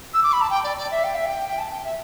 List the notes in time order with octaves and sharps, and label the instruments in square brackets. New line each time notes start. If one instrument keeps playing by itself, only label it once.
[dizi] E6
D6
B5
A5
G5
D5
D5
E5
G5
E5
G5
G5
A5
G5
E5